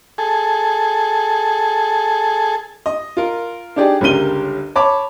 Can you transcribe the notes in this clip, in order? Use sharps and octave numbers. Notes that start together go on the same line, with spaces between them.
G#4 A4
D#5
F4 A#4
D4 D#4 G4 G#4 D5
G1 C#2 G3 A#4 D#7 G7
C#5 A5 B5 D6